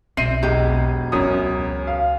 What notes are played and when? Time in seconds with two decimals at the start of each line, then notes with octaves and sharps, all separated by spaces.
0.17 B1 C4 E5 C7 D#7
0.43 E1 F#3 G#3 G4
1.12 C#2 F#2 C#4 D#6
1.87 F5